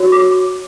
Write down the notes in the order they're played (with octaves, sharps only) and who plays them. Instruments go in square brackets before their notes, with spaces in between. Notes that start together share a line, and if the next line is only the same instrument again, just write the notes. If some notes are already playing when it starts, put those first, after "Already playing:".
Already playing: [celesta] F#4 C#5
D6